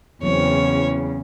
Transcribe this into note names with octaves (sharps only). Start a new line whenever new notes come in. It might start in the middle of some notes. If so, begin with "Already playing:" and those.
E2 C#3 E3 F#3 C4 C#5